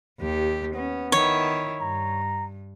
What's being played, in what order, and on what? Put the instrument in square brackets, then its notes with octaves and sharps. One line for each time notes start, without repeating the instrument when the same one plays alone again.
[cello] D#2 G4
[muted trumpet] B3 [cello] C#4
[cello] D#3 E4 [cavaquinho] C#5
[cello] G2 [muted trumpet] A#5